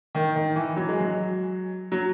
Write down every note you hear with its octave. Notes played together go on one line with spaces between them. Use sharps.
D#3
D#3
E3
F#3
G#3
F#3
F#3